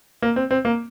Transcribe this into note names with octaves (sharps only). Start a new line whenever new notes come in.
A#3
C4
C4
A#3